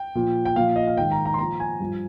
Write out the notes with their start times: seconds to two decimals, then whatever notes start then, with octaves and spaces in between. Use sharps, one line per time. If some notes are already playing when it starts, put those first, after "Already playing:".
Already playing: G5
0.15 A#2 F3
0.45 G5
0.56 A#2 F3 F5
0.76 D#5
0.87 F5
0.97 G#2 D#3 G5
1.11 A#5
1.25 A#5
1.34 C6
1.38 A#2 F3 A#5
1.60 G#5
1.80 G2 F3